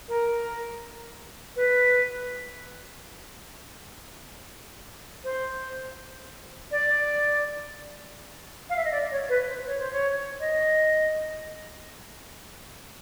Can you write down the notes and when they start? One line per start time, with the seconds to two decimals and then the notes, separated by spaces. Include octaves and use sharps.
0.08 A#4
1.56 B4
5.24 C5
6.71 D5
8.70 F5
8.77 E5
8.85 D#5
8.92 D5
9.11 C#5
9.29 B4
9.47 C5
9.66 C#5
9.79 C5
9.93 C#5
10.40 D#5